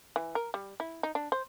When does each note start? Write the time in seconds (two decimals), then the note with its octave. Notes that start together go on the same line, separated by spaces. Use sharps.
0.16 E3
0.35 A#4
0.54 G3
0.80 E4
1.03 D#4
1.15 D4
1.32 C5